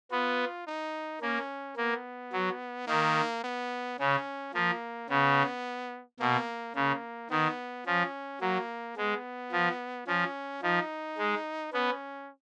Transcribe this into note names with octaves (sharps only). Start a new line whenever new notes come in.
B3 F4
D#4
A#3 C#4
A#3 B3
F#3
D#3 A#3
B3
C#3 C#4
F3 A#3
C#3 B3
B2 A#3
C#3 A#3
D#3 B3
F3 C#4
F#3 A#3
G#3 B3
F3
F3 C#4
F3 D#4
G#3
B3 C#4